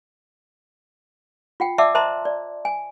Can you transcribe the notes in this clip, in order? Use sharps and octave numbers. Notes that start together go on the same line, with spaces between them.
F4 F#5 G5
D5 E5 F#5 A5 D6 E6
C5 D#5 E5 A5 A#5 C6
D5
G#5